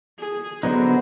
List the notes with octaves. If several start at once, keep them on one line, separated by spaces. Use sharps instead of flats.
G#4
D3 F#3 B3 D#4 C5